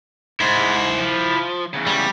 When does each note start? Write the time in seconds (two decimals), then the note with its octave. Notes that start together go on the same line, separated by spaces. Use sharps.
0.41 G#2 E4 C5
0.99 F3
1.73 E2 C#3
1.87 G3